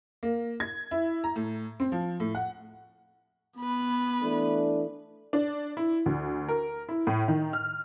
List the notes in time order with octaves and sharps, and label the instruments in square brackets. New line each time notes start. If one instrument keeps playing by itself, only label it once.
[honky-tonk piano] A#3
G#6
E4
A#5
A2
C4
F3
A2
F#5
[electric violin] B3 B4
[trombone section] E3 A3 D4
[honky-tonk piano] D4
E4
D2
A#4
E4
A2
D#3
F6